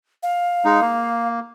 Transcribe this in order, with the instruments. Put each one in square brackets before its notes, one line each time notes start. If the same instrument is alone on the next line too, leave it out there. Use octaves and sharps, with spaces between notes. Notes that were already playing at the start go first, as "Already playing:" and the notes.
[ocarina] F5
[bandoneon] G#3 D#4
A#3